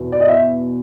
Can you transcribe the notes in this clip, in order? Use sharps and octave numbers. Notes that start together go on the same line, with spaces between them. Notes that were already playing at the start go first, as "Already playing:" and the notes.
Already playing: E2 B2
D5
D#5
E5